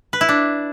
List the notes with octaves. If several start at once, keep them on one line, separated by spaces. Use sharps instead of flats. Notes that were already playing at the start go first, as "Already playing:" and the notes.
B4
E4
D4